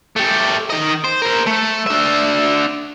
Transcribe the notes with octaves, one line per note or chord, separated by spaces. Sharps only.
A3 G4
D#3 D#5
C5
A#4 C5
A3
D4 E5